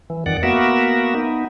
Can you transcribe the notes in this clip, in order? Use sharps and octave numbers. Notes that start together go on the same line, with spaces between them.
E3
F2 D#3 D5 F#5
A#3 B3 F#4 A#4 E5
B3 D#4